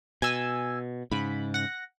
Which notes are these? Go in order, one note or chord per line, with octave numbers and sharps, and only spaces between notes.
B2 G#5 E6
G#2 C#3 B5
F#5 A#6